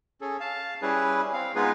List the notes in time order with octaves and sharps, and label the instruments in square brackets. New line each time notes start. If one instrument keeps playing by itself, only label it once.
[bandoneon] C#4 G#4 A4
F5 A5
G3 C#4 E4 G#4 B4
C4 F5
G#3 B3 D#4 F4 G#4 B4